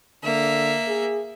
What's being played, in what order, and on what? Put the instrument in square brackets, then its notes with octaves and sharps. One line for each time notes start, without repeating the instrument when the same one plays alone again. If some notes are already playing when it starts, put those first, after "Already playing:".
[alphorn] D3 [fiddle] A#3 E5
[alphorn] G#4